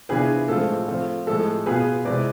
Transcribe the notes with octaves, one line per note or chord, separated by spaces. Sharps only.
C3 E3 B3 D4 F4 G#4 B4
A2 F3 G#3 C4 F4 A4
F3 A3 C4 F4
A2 F3 G#3 A4
B2 B3 F4 G#4 B4
C3 E3 G#3 C4 B4 D5